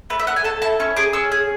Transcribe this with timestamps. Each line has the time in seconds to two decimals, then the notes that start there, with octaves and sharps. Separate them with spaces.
0.10 A3 B4
0.19 E5
0.27 A3 F#5
0.36 G#5
0.44 A4 A5
0.62 E4 A5
0.80 C#4 C#6
0.96 G#4 D6
1.13 C#4 E6
1.32 G#4